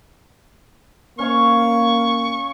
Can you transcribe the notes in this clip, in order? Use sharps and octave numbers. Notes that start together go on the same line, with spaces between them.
A#3 C#4 C#5 F5 C#6